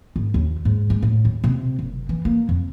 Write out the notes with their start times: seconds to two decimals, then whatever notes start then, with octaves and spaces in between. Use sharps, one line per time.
0.16 G#1
0.34 D#2
0.65 G#2
0.90 G#3
1.02 A2
1.25 D#2
1.44 C3
1.79 F#1
2.09 E3
2.25 A#3
2.49 F2